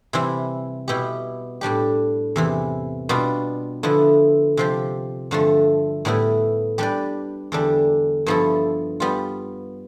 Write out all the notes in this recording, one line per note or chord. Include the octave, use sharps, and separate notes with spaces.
C3 E3 G3 C4 E4
B2 B3 E4 G4
A2 G3 D4 G4
E2 C3 E3
B2 G3 B3 D4 F4
D3 F3 B3 E4 B4
C3 F3 C4 G4
G2 D3 F3 A3
A2 G3 B3 E4 B4
G3 D4 G4 B4 D5
E2 D3 G3 D4
G2 F3 B3 E4 A4
G3 B3 F4